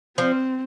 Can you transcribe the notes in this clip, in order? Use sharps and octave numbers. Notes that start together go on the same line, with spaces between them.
F3 C4